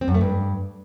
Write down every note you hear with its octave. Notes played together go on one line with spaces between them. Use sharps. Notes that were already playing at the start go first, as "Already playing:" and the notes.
C4
F#2
A3
G2